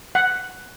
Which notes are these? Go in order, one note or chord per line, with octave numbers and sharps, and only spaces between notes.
F#5